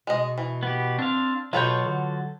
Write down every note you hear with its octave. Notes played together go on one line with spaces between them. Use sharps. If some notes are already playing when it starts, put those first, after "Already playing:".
B2 G#3 D#5
E3
B3 G4
C4 D4 F5
B2 F#3 F4 A4 B4 C#5 G6
D3